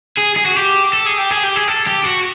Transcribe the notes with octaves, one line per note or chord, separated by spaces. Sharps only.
G#4
G#4
F#4
G4
A4
G#4
G4
G#4
G4
G#4
A4
G4
F#4